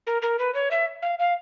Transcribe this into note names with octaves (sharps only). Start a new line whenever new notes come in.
A#4
A#4
B4
C#5
E5
F5
F5